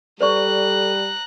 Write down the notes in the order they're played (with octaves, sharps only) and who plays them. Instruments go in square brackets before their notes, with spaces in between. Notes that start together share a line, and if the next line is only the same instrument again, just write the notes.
[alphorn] G3 [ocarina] A4 [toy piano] B4 D5 C#6 [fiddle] A#5 F#6